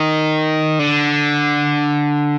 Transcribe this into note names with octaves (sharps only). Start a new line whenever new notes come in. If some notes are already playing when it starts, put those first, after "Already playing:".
Already playing: D#3
D3